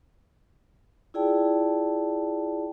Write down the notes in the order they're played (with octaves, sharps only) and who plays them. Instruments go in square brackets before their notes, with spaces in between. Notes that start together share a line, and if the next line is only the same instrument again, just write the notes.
[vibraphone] E4 F4 G#4 D5 G5 A5